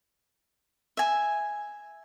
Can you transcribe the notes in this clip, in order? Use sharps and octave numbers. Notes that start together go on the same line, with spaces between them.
E5 G#5